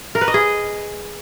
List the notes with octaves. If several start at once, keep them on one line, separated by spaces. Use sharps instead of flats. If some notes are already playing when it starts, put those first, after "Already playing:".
A#4
B4
D#5
G#4